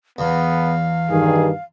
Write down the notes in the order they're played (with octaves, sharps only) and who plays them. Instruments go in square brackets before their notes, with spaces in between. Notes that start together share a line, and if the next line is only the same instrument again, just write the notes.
[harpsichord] E2 [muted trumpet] B3 [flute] F5
[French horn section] G2 D#3 [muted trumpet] G#4